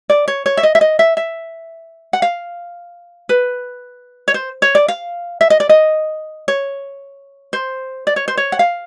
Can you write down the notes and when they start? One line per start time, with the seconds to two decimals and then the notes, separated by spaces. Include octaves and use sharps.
0.10 D5
0.28 C#5
0.46 C#5
0.57 E5
0.63 D#5
0.75 E5
0.81 D#5
0.99 E5
1.17 E5
2.13 F#5
2.22 F5
3.29 B4
4.28 C#5
4.34 C5
4.62 C#5
4.75 D5
4.88 F5
5.41 E5
5.50 D#5
5.60 D5
5.69 D#5
6.48 C#5
7.53 C5
8.07 D5
8.16 C#5
8.28 C5
8.37 C#5
8.52 F#5
8.59 F5